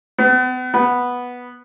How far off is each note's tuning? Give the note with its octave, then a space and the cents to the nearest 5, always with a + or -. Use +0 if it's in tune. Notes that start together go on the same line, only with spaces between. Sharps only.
B3 +40
B3 -5